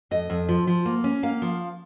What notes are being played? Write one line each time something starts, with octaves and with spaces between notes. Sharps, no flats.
F2 D#5
F2
F3
F3
A#3
C#4
A#3 F5
F3